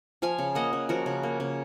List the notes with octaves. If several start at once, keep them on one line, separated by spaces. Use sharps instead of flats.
F3 F5 G#5
C#3
A#3 D#5 F#5
C#3
F3 F#4 A#4
C#3
A#3
C#3